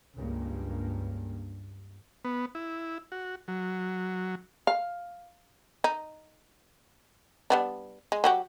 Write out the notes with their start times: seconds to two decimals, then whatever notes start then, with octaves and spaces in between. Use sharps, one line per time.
0.17 C#2 G2 A#3
2.25 B3
2.55 E4
3.12 F#4
3.48 F#3
4.67 F5
5.84 D#4
7.50 G3 B3 D4
8.12 G#3
8.24 F#3 F#4 G4